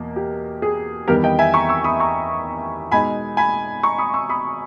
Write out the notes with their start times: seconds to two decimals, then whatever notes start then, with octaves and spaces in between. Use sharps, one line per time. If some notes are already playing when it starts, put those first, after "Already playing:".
Already playing: E2 B2 A#3
0.16 G4
0.62 G#4
1.08 E2 D#3 G3 B3 G4 A#4
1.24 D#5 G5
1.39 E5 G#5
1.54 A#5 C#6
1.69 C#6 E6
1.84 B5 D#6
2.00 A#5 C#6
2.92 B2 G#3 D#4 G#5 B5
3.37 G#5 B5
3.83 A#5 C#6
3.98 B5 D#6
4.14 C#6 E6
4.29 B5 D#6